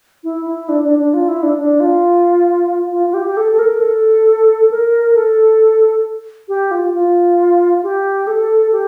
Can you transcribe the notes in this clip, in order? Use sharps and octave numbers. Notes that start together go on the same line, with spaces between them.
E4
E4
D4
D4
D4
F4
E4
D4
D4
F4
F4
F4
G4
G4
A4
A4
A#4
A4
A#4
A4
G4
F4
F4
G4
A4
G4